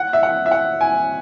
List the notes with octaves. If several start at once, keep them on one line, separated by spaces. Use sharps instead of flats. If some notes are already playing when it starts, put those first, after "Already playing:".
Already playing: F#5
E5
F#5
E5
F#5
G#5